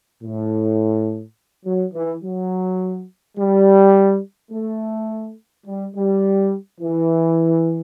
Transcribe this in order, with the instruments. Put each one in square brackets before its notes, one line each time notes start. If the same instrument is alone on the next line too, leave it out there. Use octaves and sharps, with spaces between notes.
[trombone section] A2
F#3
E3
F#3
G3
A3
G3
G3
E3